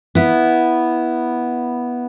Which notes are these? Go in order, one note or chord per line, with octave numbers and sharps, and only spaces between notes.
B3 E4